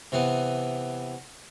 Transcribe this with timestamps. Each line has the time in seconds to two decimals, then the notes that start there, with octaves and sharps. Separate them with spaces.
0.12 C3 E3 B3